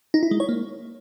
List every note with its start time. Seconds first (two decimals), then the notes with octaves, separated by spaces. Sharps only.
0.14 D#4
0.23 E4
0.31 G#3
0.40 C#5
0.49 A#3